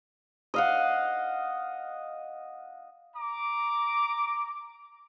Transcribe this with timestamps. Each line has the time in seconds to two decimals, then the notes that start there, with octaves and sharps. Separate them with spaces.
0.54 D#5 F5 F#5
3.17 A#5 D6